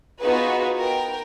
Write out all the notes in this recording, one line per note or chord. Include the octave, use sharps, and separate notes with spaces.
B3 D#4 F4 F#4 G#4 B4
A#4 G5